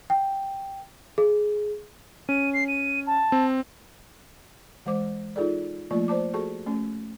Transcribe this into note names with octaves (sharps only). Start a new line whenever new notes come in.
G5
G#4
C#4 D#7
C7
D#7
A5
C4
E3 G#3 C5 D6
D#4 F4 G#4 A4 D5
F3 A3 A#3 F4 D5 C#6
C5 D5 A5 D6
F#4 G#4 A4 A5 C#6
A3 C#4